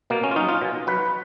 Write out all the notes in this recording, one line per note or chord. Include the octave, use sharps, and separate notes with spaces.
B2 A#3
C#4
F4
F#3 D#4
F4
B2
F#3 B4